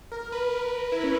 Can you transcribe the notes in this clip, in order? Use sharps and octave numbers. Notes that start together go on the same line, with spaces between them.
A#4
B4
A#4
E4
C#4